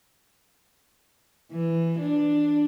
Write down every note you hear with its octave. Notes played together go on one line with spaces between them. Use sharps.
E3
D4